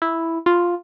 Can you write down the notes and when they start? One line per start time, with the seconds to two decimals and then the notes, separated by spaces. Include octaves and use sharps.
0.02 E4
0.46 F4